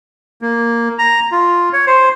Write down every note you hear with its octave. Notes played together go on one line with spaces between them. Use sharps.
A#3
A#5
F4
C#5
C5